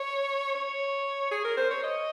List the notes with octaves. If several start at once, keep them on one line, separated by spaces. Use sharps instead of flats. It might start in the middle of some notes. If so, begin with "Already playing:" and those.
Already playing: C#5
C#5
G#4
A#4
C5
C#5
D#5